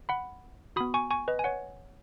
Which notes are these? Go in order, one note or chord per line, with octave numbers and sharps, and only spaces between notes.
F#5 B5
B3 F#4 B5 D#6
G#5 C#6
G#5 C#6
B4 D#5
G#5
C#5 F#5